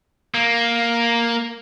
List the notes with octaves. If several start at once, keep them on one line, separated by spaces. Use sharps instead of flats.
A#3